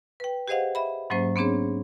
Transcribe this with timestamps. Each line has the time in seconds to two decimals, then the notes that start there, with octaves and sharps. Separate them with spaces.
0.20 B4 G5
0.48 G4 G#4 C5 D#5 F5 F#5
0.75 E5 B5
1.10 G#2 F#3 A#3 C#4 C5
1.36 B3 C4 D4 G#4 C#5